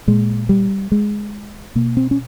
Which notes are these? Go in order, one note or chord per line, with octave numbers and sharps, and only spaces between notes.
A#2 G#3
G3
G#3
B2 A#3
C4
C#4